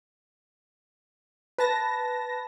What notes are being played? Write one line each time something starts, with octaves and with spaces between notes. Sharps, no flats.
B4 A5 A#6